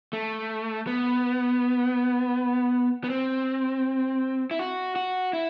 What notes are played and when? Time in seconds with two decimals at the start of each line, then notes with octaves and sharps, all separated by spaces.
0.13 A3
0.87 B3
3.04 B3
3.10 C4
4.51 E4
4.59 F#4
4.96 F#4
5.33 E4